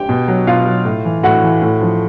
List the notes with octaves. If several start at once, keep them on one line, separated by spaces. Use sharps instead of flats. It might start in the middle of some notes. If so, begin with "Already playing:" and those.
Already playing: G4 G5
B2
F#3
B2 F4 F5
F#3
A2
E3
A2 F#4 F#5
E3
A2
F3